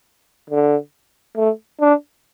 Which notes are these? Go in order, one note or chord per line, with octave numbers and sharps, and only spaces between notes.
D3
A3
D4